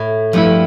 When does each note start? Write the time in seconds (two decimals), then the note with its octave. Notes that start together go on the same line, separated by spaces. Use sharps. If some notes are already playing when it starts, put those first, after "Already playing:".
Already playing: A2
0.33 G2 F3 A3 E4